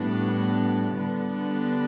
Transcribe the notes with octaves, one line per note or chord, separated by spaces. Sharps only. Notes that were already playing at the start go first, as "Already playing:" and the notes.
Already playing: A2 G3 B3 D4
D3 G3 B3 D4